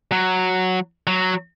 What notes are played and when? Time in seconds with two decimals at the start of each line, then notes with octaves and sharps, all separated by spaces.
0.12 F#3
1.07 F#3